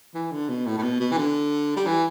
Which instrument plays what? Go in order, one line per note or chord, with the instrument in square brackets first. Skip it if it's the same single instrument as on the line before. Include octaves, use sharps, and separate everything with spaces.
[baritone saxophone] E3
D3
B2
A2
A2
B2
B2
E3
D3
G3
E3